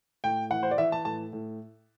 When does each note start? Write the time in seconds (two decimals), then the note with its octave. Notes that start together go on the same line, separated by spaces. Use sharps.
0.24 A2 G5
0.50 E3 F#5
0.63 C5
0.71 D5
0.78 E3 E5
0.92 A5
1.05 A2 A5
1.33 A2